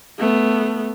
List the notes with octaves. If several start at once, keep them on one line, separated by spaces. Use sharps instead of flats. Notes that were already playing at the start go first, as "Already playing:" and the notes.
A3 B3